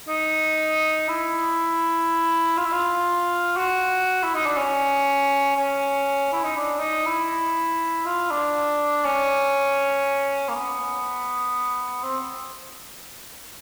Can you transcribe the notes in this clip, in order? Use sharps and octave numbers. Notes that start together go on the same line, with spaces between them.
D#4
E4
F4
E4
F4
F#4
E4
D#4
D4
C#4
C#4
E4
D#4
D4
D#4
E4
F4
D4
C#4
A#3
B3
C4